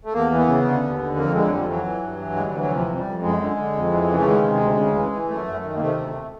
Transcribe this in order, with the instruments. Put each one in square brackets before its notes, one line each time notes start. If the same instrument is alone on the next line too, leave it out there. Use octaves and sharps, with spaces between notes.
[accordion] A3
E2 A#3
E3
B3
C#3
D3
D#2
D3
F2 A#3
D3 G#3
F#3
F2 G3
E3 F#3
E3
G2
E3
D2 G#3
G3
E3
F#3
C3 F3
F2
G3
F2
F#2 G#3
D3
D3
F2
E3
C#3
A3
D#3 G#3
C3
D2
C#3
E3
E3
F#2 A3
F#2
D#3
A#3
C3 A3
D2